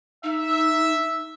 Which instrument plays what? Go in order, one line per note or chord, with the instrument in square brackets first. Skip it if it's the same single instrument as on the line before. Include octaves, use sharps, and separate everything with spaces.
[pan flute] D#4 [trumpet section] E5